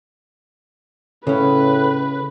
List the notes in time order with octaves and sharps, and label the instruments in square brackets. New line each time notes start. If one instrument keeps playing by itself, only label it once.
[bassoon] A2 [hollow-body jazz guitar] C#3 C#4 [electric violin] B4